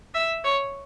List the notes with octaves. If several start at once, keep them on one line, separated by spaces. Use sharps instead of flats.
E5
C#5